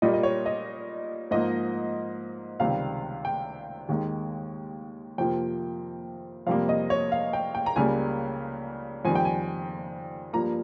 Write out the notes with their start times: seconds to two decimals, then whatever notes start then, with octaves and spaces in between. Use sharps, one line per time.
0.02 A#2 G3 A#3 D#5
0.13 D#5
0.23 C#5
0.46 D#5
1.31 G#2 F3 A#3 D#5
2.60 C#2 C3 D#3 G3 F5
3.25 G5
3.89 D#2 D#3 G#3
5.18 F2 C3 F3 A#3 G5
6.47 F2 C3 G3 A#3 F5
6.69 D#5
6.90 C#5
7.12 F5
7.33 G5
7.55 G5
7.66 A#5
7.76 C#2 C#3 G3 A#3 G#5
9.05 F2 D#3 G3 G#5
9.15 G5
9.25 G#5
10.33 G2 F3 A#3 A#5